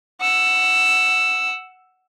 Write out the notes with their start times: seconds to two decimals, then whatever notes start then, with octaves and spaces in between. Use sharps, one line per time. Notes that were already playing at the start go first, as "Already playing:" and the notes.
0.21 F#5 E6